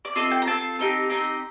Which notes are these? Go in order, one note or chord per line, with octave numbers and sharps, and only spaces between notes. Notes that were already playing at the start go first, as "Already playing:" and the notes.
D5
C4 F4 A4 D#5
G5
A#5
C4 F4 A4 A5
C4 D#4 G4
C4 D#4 G4 A#5